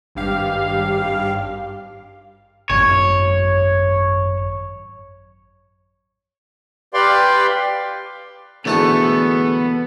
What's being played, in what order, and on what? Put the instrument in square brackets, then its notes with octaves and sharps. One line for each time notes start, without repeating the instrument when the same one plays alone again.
[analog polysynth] G#1 G2 G4 F5
[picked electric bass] G#1 F#2 [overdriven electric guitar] C#5
[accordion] G4 B4 D5 F5 G5 C6
[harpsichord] G#2 A3 A5 [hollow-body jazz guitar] B2 D3 E3 [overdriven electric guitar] B3 [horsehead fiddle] A4